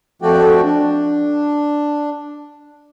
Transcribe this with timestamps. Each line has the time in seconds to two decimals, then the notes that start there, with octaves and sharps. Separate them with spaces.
0.22 F2 F3 A3 F#4 D5 G5
0.64 D4